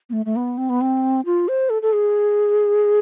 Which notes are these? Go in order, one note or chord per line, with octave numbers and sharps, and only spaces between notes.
B3
A3
A3
B3
C4
B3
C4
F4
C5
A4
A4
G#4